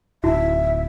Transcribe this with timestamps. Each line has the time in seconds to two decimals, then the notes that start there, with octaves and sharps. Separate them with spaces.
0.24 D1 D#4 E4 F#4 E5